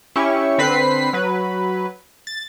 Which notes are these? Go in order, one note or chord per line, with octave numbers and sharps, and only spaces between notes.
C#4 E4 G4 C#6
D3 C4 B4 B5 B6 C7
F#3 B4
A6